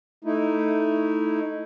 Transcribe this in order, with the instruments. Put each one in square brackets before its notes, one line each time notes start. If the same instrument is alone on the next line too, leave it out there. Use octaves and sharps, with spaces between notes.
[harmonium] A3 D#4 E4